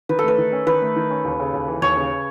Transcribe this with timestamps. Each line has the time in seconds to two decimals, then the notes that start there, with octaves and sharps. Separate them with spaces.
0.09 D#3 B4
0.19 A4
0.24 A3 B4
0.38 D#3
0.52 C#4
0.66 D#3 B4
0.82 A3
0.96 D#3
1.10 C#4
1.25 D#2
1.39 C#3
1.53 D#2
1.68 E3
1.82 D#2 C#5
1.96 C#3